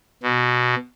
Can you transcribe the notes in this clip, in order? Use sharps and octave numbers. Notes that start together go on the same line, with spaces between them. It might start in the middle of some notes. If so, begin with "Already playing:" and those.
B2